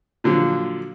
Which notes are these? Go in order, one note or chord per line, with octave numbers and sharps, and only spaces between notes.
A#2 D3 F3 F#3